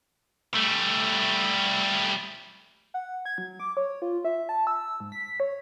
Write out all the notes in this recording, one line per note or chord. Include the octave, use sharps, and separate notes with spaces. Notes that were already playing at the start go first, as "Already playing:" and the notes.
G3 A3
F#5
G#6
F#3
D6
C#5
F4
E5
A5
E6
G#2
B6
C#5